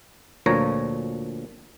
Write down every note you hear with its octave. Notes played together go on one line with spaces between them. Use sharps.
D2 A#2 F3 C#5 A#5